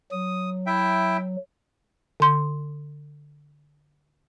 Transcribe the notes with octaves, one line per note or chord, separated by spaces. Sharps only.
F#3 D#6
E4 E5 G5
D3 C6